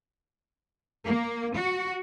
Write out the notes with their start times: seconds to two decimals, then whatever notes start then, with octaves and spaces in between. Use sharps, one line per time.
1.05 A#3
1.54 F#4